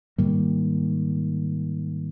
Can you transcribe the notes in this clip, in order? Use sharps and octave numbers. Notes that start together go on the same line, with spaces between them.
G#2 D#3 G3 A#3